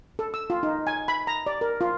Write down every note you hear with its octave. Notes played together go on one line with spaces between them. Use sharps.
A4
E6
F4
D#4
G#5
B5
A#5
D5
A#4
F4